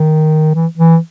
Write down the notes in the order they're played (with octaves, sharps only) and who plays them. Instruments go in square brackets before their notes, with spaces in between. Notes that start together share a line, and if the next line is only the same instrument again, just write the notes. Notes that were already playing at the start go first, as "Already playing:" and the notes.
Already playing: [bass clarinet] D#3
E3
E3